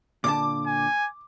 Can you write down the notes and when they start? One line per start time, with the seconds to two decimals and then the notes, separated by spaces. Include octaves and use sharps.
0.24 A#2 D3 A5 D6
0.67 G#5